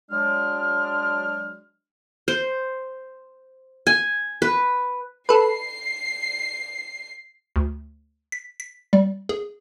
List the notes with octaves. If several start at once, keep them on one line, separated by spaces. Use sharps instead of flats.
F#3 G#3 D4 F6
C5
G#5
B4
A4 B4 C7
D2
B6
B6
G3
G#4